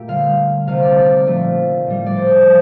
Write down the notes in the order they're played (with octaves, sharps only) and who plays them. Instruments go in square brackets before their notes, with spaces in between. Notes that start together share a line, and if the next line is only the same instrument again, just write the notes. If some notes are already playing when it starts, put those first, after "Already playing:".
Already playing: [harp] A#2 A3 G4
D3 G3 F5
C3 D#3 A3 F5
D5
D5
A#2 F3 A3
A2 G3
D5
C5
F3 A3